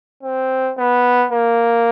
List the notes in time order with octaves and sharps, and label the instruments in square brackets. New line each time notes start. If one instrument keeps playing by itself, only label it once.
[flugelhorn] C4
B3
A#3